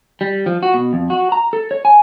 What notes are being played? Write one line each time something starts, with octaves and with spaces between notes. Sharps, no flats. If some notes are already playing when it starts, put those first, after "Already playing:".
G3
F3
F#4
B2
F2
F#4
A#5
A4
C#5
G#5